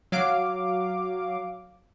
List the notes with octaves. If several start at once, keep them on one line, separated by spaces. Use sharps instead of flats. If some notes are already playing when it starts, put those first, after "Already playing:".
F#3 F5 D6